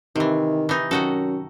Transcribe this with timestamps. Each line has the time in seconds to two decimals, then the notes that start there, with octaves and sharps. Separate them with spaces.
0.16 C3 D#3 E3
0.69 E3 D#4
0.91 F#2 D#3 F#4 A4